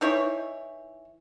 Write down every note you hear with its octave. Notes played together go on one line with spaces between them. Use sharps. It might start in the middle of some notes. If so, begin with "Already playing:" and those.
E3 D#4 E4 C#5